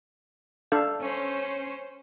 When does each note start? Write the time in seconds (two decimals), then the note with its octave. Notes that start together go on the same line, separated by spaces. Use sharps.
0.72 D4 A4 F5
1.02 C#4 C5